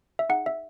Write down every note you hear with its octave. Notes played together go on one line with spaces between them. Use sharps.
E5
D#4 G#4 F#5
E5